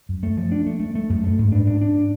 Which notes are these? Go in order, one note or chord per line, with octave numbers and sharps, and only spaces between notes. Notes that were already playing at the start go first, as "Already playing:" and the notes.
F#2
A3
F3
D4
A3
A3
A3
F#2
A3
G#2
D4
D4
D4